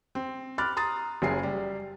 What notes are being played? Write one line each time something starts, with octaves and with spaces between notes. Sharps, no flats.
C4
B5 D6 F6 F#6 A6
A#5 C6 D#6 A6
F#1 F#3 G#4 C7
G3